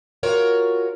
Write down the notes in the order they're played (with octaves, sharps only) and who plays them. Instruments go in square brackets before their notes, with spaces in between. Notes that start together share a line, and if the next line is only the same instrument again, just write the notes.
[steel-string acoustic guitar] F4 F#4 A#4 C#5